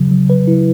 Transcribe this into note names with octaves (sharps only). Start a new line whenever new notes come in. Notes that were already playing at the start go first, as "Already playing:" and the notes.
Already playing: C#3 F#3
F#3
B4
E4